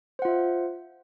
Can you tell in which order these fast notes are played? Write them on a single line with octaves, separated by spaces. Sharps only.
C5 F#5 F4 E5